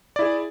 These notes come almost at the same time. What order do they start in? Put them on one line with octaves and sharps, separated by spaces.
D5 E4 G#4